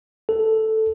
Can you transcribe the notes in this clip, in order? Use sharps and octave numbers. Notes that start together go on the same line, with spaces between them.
A4